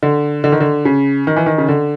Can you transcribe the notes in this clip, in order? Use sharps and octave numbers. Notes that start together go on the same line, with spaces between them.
D3
D3
D#3
D3
C#3
D#3
E3
D#3
C#3
D3